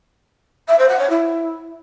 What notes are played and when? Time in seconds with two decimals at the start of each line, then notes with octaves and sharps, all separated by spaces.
0.68 E5
0.78 C5
0.88 F#5
0.99 C#5
1.09 E4